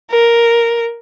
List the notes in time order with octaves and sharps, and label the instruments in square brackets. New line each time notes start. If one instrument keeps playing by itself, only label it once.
[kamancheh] A#4